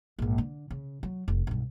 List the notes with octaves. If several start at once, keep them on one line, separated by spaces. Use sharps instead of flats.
A#1 G#2
D3
C#3
F#3
F1
B1 G2